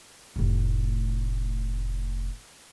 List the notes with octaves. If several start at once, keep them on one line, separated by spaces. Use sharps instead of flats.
F1 A2